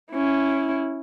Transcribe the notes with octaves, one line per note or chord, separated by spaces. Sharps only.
C#4 E4